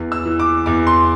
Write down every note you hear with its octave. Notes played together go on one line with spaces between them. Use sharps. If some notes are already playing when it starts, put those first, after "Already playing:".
Already playing: E2
E6
E3
D6
E2 D6
C6